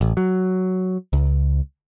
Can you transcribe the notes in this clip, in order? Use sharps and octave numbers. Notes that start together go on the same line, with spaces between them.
A1
F#3
C#2